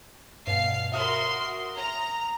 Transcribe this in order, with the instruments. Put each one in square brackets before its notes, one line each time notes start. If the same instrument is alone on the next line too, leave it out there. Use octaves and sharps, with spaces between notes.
[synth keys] G2 B2 [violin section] F5 C7
[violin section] F#4 A#4 C6 [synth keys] E5 D#6 F6
[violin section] A#5